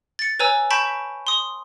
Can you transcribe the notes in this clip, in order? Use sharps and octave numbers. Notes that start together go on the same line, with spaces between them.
A6 C#7
B4 C#5 G#5 A#5 E6
A5 B5 C#6 G6 B6 D7
C6 D#6